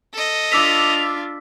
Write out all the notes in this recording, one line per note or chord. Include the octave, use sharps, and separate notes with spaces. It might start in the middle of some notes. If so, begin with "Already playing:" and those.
A4 D#5
D4 F4 D6 E6 B6 F7